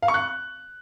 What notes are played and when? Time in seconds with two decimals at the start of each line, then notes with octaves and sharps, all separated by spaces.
0.03 F5
0.08 C#6
0.14 F#6